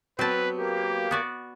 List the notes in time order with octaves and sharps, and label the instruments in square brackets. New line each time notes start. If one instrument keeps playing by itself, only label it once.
[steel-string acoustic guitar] F#3 B3 [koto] C4 A5 [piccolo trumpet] B4
[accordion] A#3 [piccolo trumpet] G4
[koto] B3 F#4 D5